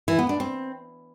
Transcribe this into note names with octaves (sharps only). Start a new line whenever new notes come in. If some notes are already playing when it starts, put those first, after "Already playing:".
E3
B3
D4
C4